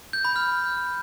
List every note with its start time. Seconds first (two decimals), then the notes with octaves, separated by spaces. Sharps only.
0.13 G6
0.25 B5
0.36 F6